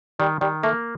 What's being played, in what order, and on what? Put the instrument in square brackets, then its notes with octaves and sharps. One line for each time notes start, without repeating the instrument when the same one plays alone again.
[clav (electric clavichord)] D#3 [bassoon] G3
[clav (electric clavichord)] D#3 [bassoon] G3
[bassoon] A3 [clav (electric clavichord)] A#3